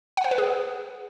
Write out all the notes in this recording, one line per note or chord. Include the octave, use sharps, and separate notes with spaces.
F#5
C5
B4
G#4